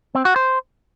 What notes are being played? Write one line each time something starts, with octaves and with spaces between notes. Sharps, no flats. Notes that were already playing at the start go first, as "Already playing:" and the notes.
C4
F#4
C5